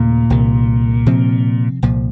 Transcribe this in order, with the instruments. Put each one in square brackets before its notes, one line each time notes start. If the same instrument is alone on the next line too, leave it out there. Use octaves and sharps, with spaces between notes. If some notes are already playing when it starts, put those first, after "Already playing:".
Already playing: [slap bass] D#2 C#3 A3 [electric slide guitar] A#2
[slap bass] C2 C3 D#3
C3 F3 C4
C2 A#2 F3